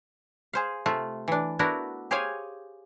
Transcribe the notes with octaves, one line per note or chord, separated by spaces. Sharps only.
G#4 C5 F5
C3 A3 F4
E3 D4
A3 B3 D4 E4 F#4 A#4
G4 G#4 C5 C#5 F5 G#5